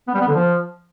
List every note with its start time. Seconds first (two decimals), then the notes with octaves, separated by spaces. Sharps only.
0.08 B3
0.15 G3
0.21 B3
0.28 D3
0.34 F3